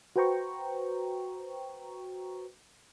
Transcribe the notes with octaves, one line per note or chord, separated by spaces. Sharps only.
F#4 B4 C5 G5 A#5 C#6